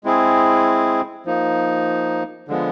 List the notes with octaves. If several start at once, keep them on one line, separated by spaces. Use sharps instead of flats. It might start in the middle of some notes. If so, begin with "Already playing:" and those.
G#3 C4 E4 G#4
F3 A#3 D#4
D3 F3 G#3 B3